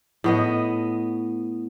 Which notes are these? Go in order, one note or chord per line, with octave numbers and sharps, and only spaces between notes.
A2 B3 D#5